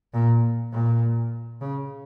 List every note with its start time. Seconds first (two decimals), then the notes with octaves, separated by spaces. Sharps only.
0.14 A#2
0.73 A#2
1.61 C#3